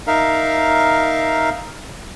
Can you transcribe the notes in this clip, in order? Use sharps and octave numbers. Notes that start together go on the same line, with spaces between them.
D#4 A#4 E5 F5